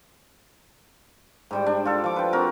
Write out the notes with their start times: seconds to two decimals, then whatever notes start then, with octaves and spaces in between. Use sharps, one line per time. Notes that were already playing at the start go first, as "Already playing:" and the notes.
1.51 G#2 G3 G5
1.66 D4
1.85 F4 A4
2.04 F3 D6
2.16 B4 G5
2.33 C4 F#4 A#4